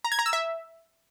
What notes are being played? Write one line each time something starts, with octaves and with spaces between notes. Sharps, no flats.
A#5
G#6
A#5
E6
E5